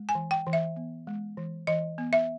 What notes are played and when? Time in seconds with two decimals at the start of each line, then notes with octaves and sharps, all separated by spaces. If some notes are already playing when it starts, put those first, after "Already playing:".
Already playing: G#3
0.09 G#5
0.15 E3
0.31 G5
0.47 E3
0.53 E5
0.76 B3
1.07 G#3
1.37 E3
1.67 E3 D#5
1.98 B3
2.13 E5